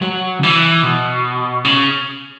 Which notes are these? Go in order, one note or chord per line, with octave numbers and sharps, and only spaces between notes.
F#3
C#3
E3
B2
C#3